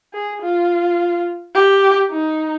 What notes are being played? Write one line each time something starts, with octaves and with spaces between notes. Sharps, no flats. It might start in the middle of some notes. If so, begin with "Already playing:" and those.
G#4
F4
G4
D#4